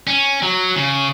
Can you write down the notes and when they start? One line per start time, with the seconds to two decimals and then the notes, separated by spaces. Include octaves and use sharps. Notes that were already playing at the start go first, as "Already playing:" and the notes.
0.07 C#4
0.42 F#3
0.76 C#3